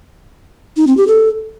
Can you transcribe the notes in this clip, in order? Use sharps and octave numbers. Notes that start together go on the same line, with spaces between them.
D#4
C4
G4
A4